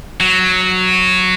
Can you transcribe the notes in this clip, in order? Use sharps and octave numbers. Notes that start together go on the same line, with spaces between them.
F#3